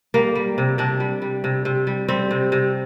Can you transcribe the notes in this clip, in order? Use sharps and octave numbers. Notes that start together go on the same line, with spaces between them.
G3 A#3
G3
C3
C3 D4
G3
G3
C3
C3
G3
G3 C4
C3
C3